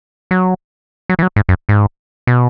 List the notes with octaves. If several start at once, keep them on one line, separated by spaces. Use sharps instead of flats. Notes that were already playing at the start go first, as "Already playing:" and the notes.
F#3
F#3
E3
F#3
G#2
F#2
G#2
B2